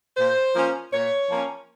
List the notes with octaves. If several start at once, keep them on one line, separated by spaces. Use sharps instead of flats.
A#2 C5
F3 A#3 C#4
A#2 C#5
F3 A#3 C#4